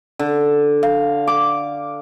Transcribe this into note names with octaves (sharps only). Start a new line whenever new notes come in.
D3
F5
D6